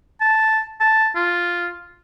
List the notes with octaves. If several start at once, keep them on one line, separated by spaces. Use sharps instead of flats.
A5
A5
F4